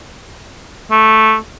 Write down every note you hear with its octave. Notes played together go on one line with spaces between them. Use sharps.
A3